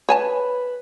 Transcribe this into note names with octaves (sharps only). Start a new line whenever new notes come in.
B4 C#5 G#5 A5